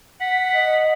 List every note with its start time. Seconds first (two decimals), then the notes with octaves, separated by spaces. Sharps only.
0.21 F#5 B6
0.55 D#5